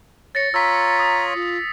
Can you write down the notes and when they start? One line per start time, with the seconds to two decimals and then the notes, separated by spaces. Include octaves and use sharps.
0.35 C#5 A6 A#6 C#7
0.54 F4 C#5 A#5 E6 B6
0.99 D#6
1.34 F4